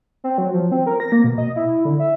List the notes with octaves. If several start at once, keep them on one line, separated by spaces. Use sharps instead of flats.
C4
F#3
F3
C4
A#4
A#6
A#3
B2
D#5
E4
D3
E5